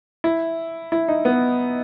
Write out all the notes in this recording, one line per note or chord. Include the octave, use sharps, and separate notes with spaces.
E4
E4
D#4
B3